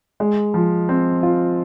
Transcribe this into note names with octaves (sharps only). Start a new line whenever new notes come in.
G#3
F3
C4
F4